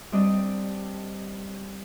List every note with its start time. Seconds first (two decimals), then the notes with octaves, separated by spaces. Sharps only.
0.12 G3 C4 D4 G4 D#5